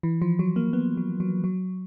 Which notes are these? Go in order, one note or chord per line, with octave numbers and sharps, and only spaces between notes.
E3
F3
F#3
A#3
B3
F#3
F#3
F#3